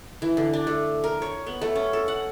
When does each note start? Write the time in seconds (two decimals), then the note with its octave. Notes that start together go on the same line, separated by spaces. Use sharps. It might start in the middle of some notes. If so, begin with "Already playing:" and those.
0.22 E3
0.37 D3
0.53 D4
0.67 A3
1.04 A#4
1.22 C#5
1.47 B3
1.61 A3
1.76 C#4
1.93 A4
2.08 F#5